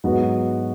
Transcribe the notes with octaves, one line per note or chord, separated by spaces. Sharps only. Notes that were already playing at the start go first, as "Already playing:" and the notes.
G#2 F#3 B3 F#4